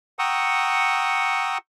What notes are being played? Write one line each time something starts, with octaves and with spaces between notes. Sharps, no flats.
F#5 G5 A#5 C#6 D#6 E6